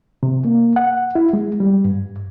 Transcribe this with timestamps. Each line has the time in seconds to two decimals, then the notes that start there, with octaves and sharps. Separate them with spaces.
0.23 C3
0.45 A#3
0.76 F#5
1.15 E4
1.33 G#3
1.60 G3
1.85 G2